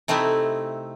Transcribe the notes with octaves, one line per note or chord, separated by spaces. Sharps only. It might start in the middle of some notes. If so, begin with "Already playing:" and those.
C3 A3 C4 D#4 E4